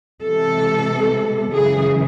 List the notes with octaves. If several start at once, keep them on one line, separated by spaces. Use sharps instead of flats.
C3 E3 G#3 A4
F#2 C#3 E3 G#3 G#4